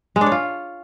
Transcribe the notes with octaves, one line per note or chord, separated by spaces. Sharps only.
G#3
D4
C#5
F4